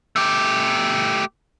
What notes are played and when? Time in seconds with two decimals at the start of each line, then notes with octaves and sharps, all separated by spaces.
0.16 A3 G4